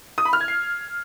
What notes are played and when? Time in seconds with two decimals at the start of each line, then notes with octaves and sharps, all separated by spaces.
0.18 D#6
0.25 B5
0.33 F6
0.40 G#6
0.48 C7